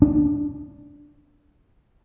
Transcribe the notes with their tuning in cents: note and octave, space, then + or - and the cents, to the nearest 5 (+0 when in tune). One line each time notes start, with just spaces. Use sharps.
D4 -5